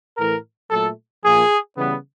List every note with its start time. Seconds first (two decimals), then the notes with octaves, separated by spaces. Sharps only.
0.18 A2 E3 A3 A#4
0.71 A#2 F#3 A3 A4
1.24 A#2 F3 A#3 G#4
1.76 C#3 E3 G3 B3